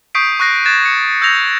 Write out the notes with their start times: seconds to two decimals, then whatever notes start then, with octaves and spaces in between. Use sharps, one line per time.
0.15 C#6 D#6 G6 B6 C7 D7
0.40 C#6 F#6 A#6 C7
0.66 F#6 G#6 A6 E7
0.85 C#7
1.22 E6 G6 G#6 A#6 F7